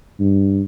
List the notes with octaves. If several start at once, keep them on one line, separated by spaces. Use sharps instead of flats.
G2